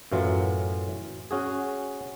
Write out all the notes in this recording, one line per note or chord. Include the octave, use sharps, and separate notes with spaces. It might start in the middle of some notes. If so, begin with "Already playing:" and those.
F#2 A2 E3 F#3 F4
C#4 F#4 G#4